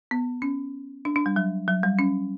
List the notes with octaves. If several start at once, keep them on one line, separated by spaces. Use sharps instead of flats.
B3
C#4
D4
D4
G3
F#3
F#3
G3
C#4